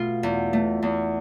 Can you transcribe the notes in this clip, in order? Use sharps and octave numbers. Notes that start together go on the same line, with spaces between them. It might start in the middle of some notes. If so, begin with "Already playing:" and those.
Already playing: B2 A3 F4
E2
A3
E2